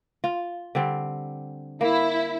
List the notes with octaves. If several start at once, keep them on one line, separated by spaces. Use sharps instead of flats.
F4
D3 G3 C4
A#3 E4